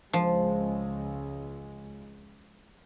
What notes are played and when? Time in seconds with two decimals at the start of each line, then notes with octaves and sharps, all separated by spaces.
0.13 C#2 F3 G#3